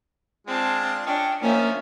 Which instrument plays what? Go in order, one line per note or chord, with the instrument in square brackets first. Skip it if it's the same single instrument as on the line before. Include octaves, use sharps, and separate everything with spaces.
[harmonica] G#3 D4 F4 [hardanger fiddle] C4 A5
[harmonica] C#4 D#5 [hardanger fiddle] D4 [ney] G5
[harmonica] D#3 F3 D#4 [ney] A#3 [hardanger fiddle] C#4 E5